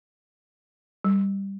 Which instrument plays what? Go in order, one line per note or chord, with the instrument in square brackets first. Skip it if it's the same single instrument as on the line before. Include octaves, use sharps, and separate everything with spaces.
[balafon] G3